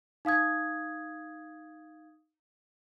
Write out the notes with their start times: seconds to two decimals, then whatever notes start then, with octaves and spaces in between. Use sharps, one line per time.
0.25 D#4 F5 D#6 G#6